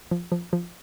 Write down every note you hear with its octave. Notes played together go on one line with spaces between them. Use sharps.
F3
F3
F3